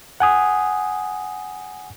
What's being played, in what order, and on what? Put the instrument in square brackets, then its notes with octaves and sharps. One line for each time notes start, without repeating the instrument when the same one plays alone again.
[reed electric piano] F#5 G#5 D#6